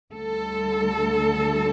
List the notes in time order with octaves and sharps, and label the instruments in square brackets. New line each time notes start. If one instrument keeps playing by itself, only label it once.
[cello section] D2 D3 G3 A4